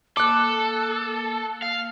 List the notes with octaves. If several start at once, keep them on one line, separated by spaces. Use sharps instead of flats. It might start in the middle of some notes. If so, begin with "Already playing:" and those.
A#3 A4 D6 F#6
F5